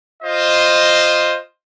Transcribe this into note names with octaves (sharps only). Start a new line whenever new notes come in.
F4 C5 D#5